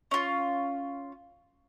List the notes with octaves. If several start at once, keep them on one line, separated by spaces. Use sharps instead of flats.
C#4 F4